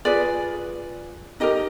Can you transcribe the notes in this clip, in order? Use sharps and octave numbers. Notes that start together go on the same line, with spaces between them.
F4 G#4 B4 D5
D#4 G4 A#4 D#5